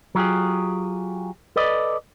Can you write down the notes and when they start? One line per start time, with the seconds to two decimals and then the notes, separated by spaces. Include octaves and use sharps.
0.15 F#3 F4 G4 G#4
1.56 A4 B4 D5 D#5